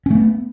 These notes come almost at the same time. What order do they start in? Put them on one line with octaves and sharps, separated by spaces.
C#4 A3 B3